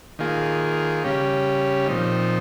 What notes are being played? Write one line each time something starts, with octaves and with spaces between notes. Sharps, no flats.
D#3 A#3 F4 G#4
C#3 G3 C#4 G4
A#2 F3 C4 D#4